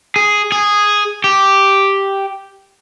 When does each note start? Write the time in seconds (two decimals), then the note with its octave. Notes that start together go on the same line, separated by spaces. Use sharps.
0.16 G#4
0.52 G#4
1.24 G4